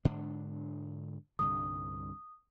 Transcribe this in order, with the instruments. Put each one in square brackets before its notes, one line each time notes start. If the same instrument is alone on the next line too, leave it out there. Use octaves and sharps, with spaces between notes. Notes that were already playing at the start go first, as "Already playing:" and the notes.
[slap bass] G#2 D3 D4
[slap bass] C2 G2 D3 [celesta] D#6